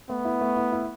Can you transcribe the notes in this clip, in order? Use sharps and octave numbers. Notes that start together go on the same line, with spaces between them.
A3 B3
E4
A3
E4
E4